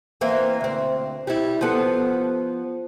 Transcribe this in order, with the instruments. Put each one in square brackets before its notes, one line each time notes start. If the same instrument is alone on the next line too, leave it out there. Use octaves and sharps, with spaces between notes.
[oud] E3 A#3 C4
D2 C4
G3 E4
F3 B3 A4